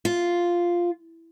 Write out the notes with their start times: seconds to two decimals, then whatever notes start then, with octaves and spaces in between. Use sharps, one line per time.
0.05 F4